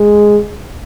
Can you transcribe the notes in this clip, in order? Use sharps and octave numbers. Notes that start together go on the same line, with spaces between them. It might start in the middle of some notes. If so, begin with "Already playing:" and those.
Already playing: G#3